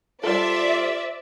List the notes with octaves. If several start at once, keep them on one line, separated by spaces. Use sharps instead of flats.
G3 F4 A4 C5 D5 E5